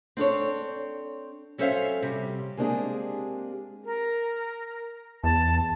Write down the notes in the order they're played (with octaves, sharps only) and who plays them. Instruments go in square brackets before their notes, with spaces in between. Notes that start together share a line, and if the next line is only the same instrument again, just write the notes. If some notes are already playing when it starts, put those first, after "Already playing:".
[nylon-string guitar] C4 D4 A4 C#5
F#3 C#4 A4 C5 E5 F5
C3 G3
[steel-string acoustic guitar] G#3 A#3 C4 D4 G4 G#4
[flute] A#4
[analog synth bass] E2 [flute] A5